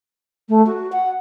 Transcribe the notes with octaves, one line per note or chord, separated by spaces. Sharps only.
A3
F#4
F#5